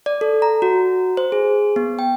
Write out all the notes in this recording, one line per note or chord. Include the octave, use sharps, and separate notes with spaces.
D5
A4
A#5
F#4
C5
G#4
B3
G5